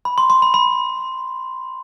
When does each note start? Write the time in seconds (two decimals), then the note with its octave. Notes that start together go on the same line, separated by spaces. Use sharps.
0.05 B5
0.18 C6
0.30 C6
0.42 B5
0.54 B5